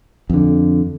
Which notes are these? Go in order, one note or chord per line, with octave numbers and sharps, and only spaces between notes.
F2 D3